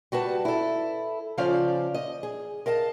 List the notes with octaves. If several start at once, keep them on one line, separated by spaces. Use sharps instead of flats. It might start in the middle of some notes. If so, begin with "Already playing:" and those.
G3 F#4 B4 A5
E4 A4
C#3 F3 C#4 C5 D5 F5
D#5
G#4
A#4 D#5 F5 A5